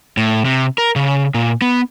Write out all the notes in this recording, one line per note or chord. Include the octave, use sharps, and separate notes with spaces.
A2
C3
A#4
C#3
A#2
B3